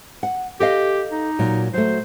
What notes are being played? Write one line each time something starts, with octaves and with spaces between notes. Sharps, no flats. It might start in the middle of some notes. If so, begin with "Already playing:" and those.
F#5
G4 A4 D#5 F5
D#4
A#2 F#3
F#3 A3 C5